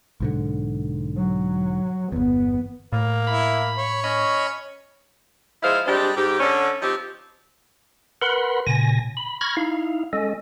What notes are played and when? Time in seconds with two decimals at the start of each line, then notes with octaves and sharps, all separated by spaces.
0.20 B1 G#2 D3
1.17 F#3
2.12 G1 E2 B3
2.93 A2 A#3
3.27 E4 B5
3.77 C#5
4.04 C#4 D#5 B5
5.63 F3 G#3 E4 C5 F5
5.86 G3 G#3 C4 D4 G4
6.16 G#2 G4
6.39 D3 C#4
6.82 F3 C4 D#4 G4
8.22 A#4 B4 F#5 B5 C6
8.67 A#2 C#3 G#5 A#6
9.17 B5
9.41 B5 C#6 F6 G#6 A#6
9.57 D#4 E4 F5
10.13 G#3 C#4 A4 D#5